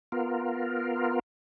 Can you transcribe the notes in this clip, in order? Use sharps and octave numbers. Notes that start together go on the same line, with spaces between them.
B3 F4 A#4